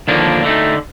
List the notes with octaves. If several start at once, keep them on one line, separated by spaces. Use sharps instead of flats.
D#2 D3 F3 A#3 D4
D3 A3 D#4